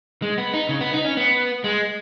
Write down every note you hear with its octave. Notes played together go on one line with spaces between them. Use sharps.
G#3
B3
D#4
C#3
B3
D#4
C#4
B3
G#3